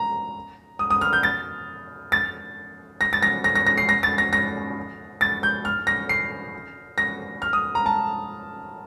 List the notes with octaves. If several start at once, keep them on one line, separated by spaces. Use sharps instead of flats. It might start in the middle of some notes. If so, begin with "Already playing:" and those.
Already playing: A#5
D#6
D#6
F6
G6
A6
A6
A#6
A6
A#6
A#6
A#6
A#6
C7
A#6
A6
A#6
A#6
A6
G6
F6
A#6
C7
A#6
F6
D#6
A#5
A5